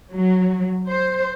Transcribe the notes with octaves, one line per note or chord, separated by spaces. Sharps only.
F#3
C5